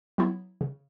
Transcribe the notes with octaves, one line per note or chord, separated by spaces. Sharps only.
F#3 B3 E4
C#3